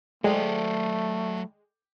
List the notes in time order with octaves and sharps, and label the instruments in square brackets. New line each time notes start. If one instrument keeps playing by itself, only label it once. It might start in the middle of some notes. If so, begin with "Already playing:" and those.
[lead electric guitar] F#3 C5 [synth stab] G#3 [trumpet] A3 [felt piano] A4 D5 G5